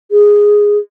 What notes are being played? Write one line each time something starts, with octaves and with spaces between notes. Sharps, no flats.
G#4